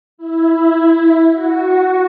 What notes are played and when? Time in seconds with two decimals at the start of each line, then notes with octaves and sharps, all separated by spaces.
0.18 E4
1.32 F#4